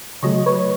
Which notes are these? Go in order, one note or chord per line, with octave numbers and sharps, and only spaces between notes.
C#3 F#3 A3 C#5 D#5
B4 C#5